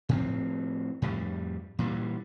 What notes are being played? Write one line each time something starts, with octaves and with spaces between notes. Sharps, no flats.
A2 F3 C4
F2 A2 G3
A#2 E3 G3